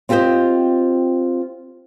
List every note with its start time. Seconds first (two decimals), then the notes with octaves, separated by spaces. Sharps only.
0.09 C4 F4 G4 A#4 C5 D#5